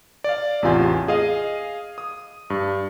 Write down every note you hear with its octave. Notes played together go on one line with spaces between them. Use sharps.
D5 F5
A1 E2 C3 F4 G#5 G6
G#4 D#5 F5 D#7
D#6
G2